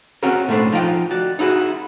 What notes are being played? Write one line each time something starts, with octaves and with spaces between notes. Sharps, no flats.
C4 C#4 F#4 G#4 A#4
B1 A2 A3 C#4 D4 C5
F3 D#4 F4 G5
F#4 D5
D#4 E4 F#4 G#4